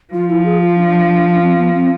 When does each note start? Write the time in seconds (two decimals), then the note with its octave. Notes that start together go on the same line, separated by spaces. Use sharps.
0.13 F3 F4
0.29 E4
0.46 G#4
0.62 F4
0.78 D4
1.42 C4
1.58 B3
1.75 C4